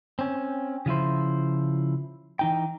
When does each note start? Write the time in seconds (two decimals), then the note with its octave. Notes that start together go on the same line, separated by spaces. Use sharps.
0.19 C4 C#4
0.86 C#3 F3 E4 C5
2.39 E3 D#4 G5